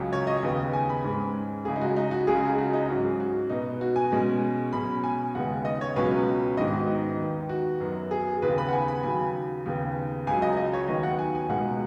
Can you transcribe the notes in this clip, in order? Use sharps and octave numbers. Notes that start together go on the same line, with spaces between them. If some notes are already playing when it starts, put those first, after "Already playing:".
Already playing: C#2 C#3 F#3 C#4
C#5
D#5
D#2 C#3 B3
G#5
B5
G#2 G#3 C#4
C#2 C#3 G#3 G#4
D#4
F#4
D#4
F#4
C#2 C#3 G#3 C#4 G#4
F#4
D#4
G#2 F#3 C#4 F#4
G#4
F#4
B2 B3 D#4
F#4
G#5
B2 G#3 C#4
B2 F#3 C#4 B5
G#5
D#2 C#3 G#3 B3 F#5
D#5
C#5
C#2 B2 F#3 C#4 B4
G#2 D#3 B3 D#5
F#4
D#4
D#4
D#2 D#3 B3
F#4
F#2 F#3 B3
G#4
D#2 C#3 B3 B4
B5
F#5
G#5
B5
D#2 C#3 F#3 G#5
D#2 C#3 B3
C#2 C#3 F#3 G#5
D#5
D#5
C#5
D#2 D#3 F#3 B3 D#5
F#5
G#5
G#5
C#2 B2 G#3 F#5